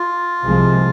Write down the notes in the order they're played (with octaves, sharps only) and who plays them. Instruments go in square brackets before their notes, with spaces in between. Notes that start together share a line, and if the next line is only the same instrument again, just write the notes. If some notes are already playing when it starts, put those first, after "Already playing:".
Already playing: [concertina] F4
[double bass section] C2 C3 F3 G#3